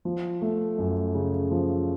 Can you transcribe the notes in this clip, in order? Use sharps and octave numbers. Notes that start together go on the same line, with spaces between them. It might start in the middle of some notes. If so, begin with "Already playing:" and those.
F3
A3
F#2
C#3
F3